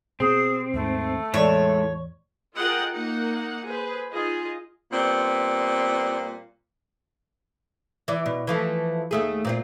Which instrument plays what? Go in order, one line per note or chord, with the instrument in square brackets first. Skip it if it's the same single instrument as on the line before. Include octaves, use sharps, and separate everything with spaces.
[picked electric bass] B2 [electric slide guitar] C4 [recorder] G#4
[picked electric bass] D#2 G#2 [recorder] A3
[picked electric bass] E2 A2 [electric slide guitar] G#3 E4 A4 [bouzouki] C#5
[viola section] F4 G#4 A#4 D#5 F#5 G5
A#3 D#4 F#5
G#4 B4 C5
D#4 F4 G#4 D#5
[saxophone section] A#2 G3 B3 C4
[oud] E3 D5
B2
E3 F3 A3
D#2 A3 G#4
A#2 C4 F4